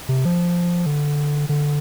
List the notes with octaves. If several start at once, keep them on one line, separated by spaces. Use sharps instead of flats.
C3
F3
D3
D3